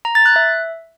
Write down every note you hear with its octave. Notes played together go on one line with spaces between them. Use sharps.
A#5
A6
F#6
E5